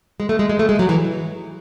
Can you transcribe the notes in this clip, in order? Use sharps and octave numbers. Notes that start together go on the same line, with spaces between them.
G#3
A3
G#3
G#3
A3
G#3
F#3
E3